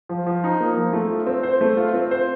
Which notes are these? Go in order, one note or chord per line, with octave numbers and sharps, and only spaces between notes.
F3
F3
D#4
A#3
F3
A3
F4
C4
C5
A3
F4
C4
C5